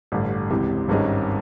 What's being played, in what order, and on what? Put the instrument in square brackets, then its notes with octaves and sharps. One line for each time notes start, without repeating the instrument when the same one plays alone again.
[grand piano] A1 G2 D3
C#2 C3 E3
G#1 G2 D#3 G#3 C#4